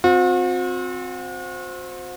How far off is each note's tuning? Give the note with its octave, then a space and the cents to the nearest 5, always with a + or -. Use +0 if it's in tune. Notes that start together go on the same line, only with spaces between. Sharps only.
C4 +0 F#4 -45